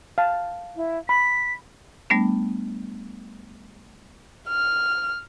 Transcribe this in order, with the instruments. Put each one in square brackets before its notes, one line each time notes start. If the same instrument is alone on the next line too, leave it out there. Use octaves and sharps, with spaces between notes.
[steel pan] F5 A5
[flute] E4
[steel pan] B5 [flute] B6
[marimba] G3 A3 B3 D4
[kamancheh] F6